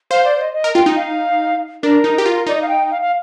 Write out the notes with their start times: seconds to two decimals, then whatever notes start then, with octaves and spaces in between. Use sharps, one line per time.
0.11 C5 F5
0.25 D5
0.39 D#5
0.53 D#5
0.64 A#4
0.75 F4 G5
0.86 D#4
0.96 F5
1.83 D4 A#4
2.04 D#4
2.18 G4
2.26 F4
2.47 D#4 D5
2.55 D#5
2.62 F5
2.68 G5
2.91 F5
3.01 F5